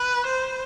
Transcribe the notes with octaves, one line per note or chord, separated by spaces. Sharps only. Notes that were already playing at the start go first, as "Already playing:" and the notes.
Already playing: B4
C5